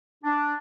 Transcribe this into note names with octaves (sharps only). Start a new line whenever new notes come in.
D4